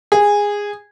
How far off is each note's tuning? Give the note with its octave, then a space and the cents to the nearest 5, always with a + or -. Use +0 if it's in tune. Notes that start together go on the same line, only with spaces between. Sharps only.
G#4 -15